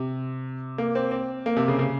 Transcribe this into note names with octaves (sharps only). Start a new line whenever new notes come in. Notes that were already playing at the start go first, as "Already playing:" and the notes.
Already playing: C3
A#3
C4
C4
A#3
C3
C#3
C#3